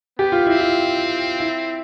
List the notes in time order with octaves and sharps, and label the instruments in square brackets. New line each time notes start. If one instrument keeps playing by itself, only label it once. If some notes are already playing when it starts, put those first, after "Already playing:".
[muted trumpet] B3 [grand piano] G4
[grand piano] F4
[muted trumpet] C4 [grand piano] E4
[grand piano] F4
E4